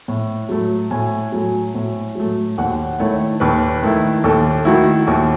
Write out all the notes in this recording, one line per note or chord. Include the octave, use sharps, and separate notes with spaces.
A2
F#3 A3
A2 G#5
F#3 A3
A2
F#3 A3
D#2 F#5
D#3 A3 E4 C#5
D#2 B4
D#3 A3 E4
D#2 A4
D#3 A3 E4 F#4
D#2